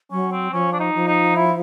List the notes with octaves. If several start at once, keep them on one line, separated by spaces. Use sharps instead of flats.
F#3 C#4
C4
F3 C#4
D4
D#4
F3
D#4
E4